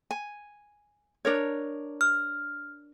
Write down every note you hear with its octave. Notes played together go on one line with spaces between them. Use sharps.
G#5
D4 A#4 C#5
F6